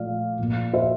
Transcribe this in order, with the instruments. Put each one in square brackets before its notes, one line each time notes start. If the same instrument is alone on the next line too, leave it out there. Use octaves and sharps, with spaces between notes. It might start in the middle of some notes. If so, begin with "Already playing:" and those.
Already playing: [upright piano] A#2 F3 A3 D5 F5
A#2 F3 A#3
C5 E5